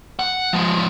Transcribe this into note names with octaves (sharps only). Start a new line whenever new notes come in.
F#5
F3 G#3